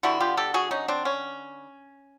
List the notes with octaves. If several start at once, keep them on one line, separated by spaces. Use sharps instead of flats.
D3 G3 B3 E4 F#4
F4 G4
G4 A4
F#4 G#4
C#4 D#4
C4 D4
C#4